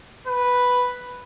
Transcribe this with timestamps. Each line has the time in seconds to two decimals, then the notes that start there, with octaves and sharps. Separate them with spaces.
0.27 B4